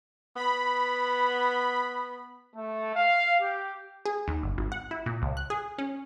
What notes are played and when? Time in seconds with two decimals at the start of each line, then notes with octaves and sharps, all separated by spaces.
0.36 B3 B5
2.55 A3
2.95 F5
3.40 G4
4.06 G#4
4.28 D#2
4.43 G1
4.58 G#1
4.72 F#5
4.91 E4
5.06 A#2
5.22 C#2
5.37 F#6
5.50 G#4
5.78 C#4